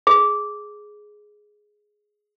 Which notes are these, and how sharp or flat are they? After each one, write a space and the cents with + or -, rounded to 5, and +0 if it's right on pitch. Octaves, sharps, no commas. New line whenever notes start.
G#4 +10